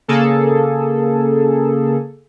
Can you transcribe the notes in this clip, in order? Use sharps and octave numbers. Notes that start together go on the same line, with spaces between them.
C#3 A#3 G#4 A4